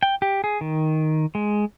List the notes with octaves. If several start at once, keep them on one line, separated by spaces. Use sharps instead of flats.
G5
G4
G#4
D#3
G#3